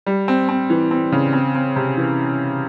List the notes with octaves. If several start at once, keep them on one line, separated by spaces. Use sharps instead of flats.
G3
C4
C4
E3
C4
C#3
C4
C4
C3
E3